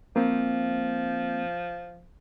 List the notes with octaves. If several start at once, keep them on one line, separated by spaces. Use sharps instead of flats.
F3 A#3 C4